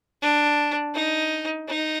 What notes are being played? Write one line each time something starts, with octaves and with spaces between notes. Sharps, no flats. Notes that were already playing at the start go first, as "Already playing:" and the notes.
D4
D#4
D#4